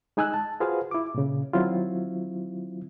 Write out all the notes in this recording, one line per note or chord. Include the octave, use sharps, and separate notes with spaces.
G#3 D#4 G#5 E6 F#6
A5
F4 F#4 G#4 B4 C5 F5
E4 D6
A#2 C#3
D#3 F#3 C4 E4 F4